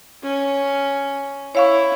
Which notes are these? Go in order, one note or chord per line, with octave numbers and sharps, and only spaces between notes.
C#4
E4 C#5 F5 C#6